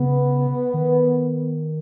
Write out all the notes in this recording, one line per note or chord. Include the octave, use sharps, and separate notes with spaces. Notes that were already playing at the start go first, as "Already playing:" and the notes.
Already playing: C#3 B3
D#3